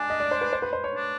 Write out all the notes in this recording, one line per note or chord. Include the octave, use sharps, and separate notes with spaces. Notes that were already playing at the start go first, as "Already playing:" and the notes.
Already playing: D4 G#5
D#5
D5
C5
B4
C5
B4
C5
C#5
D4